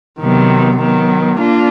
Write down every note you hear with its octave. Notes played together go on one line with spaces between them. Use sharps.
C3 D#3 F#3 B3
D#3 F#3 B3
A#3 D4 F4